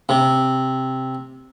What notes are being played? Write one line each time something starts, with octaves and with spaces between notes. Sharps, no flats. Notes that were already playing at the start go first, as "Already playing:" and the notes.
C3